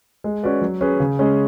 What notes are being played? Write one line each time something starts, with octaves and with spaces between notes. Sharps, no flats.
G#3
C#4 F#4 B4 D5
F#3
C#4 G#4 B4
C#3
G#3 C#4 G#4